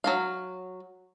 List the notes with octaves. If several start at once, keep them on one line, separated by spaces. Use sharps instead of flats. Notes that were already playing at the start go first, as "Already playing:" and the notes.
F#3 C#4 F5